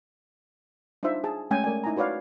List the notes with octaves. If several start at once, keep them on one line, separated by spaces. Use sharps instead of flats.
D4 D#4 F4 C5 E5
G#4 A5
G#3 A3 C#4 G5 G#5
A3 A#4 D5 G#5
D#4 E4 G#5 A#5
F#4 B4 C#5 D5 F5